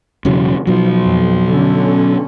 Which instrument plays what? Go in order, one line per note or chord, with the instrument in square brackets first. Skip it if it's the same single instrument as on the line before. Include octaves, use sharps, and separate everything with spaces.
[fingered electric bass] E1 C#3 F#3
[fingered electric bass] B2 F#3 [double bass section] F3
[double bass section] F2
D3 C#4